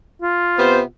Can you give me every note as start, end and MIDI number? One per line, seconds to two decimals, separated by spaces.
0.22 0.85 65
0.58 0.81 48
0.58 0.81 59
0.58 0.81 72